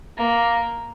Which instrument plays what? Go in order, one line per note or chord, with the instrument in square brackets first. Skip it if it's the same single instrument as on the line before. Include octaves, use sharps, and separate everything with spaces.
[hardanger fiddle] A#3